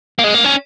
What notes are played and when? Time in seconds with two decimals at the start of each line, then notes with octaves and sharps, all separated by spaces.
0.19 A#3
0.24 G#3
0.35 A#3
0.45 C#4